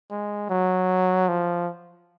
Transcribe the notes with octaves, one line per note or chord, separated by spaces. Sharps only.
G#3
F#3
F3